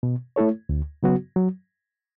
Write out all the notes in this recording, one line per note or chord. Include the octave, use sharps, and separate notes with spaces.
B2
A3 E4 A4 C#5
D2
C#3 F#3 B3 F#4
F#3